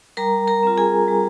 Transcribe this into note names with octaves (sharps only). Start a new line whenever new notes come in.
G3 A#4 A#5
A#4 A#5
C4 F4
G#4 G#5
G3